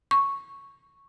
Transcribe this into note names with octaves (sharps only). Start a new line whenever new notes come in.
C#6